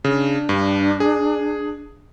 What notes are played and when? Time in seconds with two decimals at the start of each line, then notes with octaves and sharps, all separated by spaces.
0.04 C#3 D4
0.49 G2
1.00 G#4